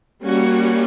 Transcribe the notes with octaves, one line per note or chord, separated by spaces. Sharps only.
G3 A#3 C#4 F#4